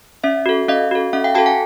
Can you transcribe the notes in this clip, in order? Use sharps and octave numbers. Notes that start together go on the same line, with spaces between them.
C#4 D5 E5
F#4 A4
C#4 D#5 F5
F#4 A4
C#4 E5 F#5
F5 G5
F#4 A4 G5 A5
F#5 G#5